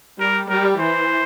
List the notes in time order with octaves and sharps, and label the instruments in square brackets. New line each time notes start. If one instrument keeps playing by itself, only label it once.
[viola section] G3 [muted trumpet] A#4
[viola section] G3 [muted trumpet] A#4
[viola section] E3 [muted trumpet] C5